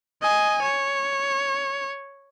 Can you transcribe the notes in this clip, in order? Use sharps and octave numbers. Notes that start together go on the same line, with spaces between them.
D#5 G#5
C#5